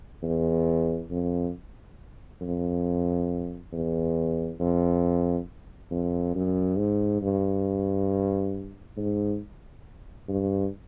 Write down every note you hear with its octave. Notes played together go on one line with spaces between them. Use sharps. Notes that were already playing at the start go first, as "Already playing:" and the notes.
E2
F2
F2
E2
F2
F2
F#2
G#2
G2
G#2
G2